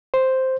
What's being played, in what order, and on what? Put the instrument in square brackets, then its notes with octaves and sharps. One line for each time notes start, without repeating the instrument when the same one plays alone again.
[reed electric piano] C5